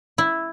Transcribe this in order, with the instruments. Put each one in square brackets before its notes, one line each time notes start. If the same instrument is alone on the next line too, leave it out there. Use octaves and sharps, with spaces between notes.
[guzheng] E4